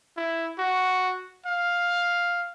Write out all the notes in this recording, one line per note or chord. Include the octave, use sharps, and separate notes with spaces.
E4
F#4
F5